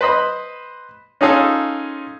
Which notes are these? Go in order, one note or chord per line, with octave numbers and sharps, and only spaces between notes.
B4 C5 D#5 B5
C#4 D#4 F4 G#4 A4